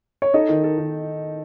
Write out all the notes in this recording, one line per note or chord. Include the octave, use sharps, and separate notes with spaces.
C#5
D#4 A4 D#5
D#3
A4
D#3